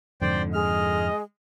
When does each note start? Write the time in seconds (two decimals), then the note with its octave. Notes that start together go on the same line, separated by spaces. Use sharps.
0.22 F2 G#2 D3 C5 D5 G5
0.53 G#3 D#5 F6